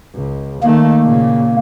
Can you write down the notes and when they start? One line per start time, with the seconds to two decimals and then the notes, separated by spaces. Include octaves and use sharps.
0.14 C#2
0.63 D#3 A3 A#3
1.04 A#2 C#3